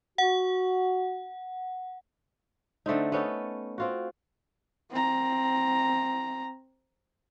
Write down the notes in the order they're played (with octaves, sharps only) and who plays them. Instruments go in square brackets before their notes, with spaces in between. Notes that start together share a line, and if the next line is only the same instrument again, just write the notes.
[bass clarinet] F#4 [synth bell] F#5
[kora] D3 A3 C4 D#4
B3 C#4 D#4 A4
C4 F4 F#4
[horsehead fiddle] C4 A#5